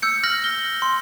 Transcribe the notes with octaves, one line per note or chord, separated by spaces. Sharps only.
E6 G6 C#7
F6 G6 A#6 F#7
G7
C6